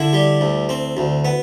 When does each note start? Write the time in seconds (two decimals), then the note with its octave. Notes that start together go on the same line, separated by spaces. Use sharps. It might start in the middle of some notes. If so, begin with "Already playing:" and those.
Already playing: D3 E4
0.13 G3
0.41 D2
0.69 C4
0.97 D2
1.25 B3